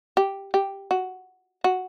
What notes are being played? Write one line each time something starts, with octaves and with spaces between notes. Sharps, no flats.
G4
G4
F#4
F#4